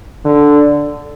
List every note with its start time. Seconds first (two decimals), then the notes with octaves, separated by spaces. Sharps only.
0.25 D3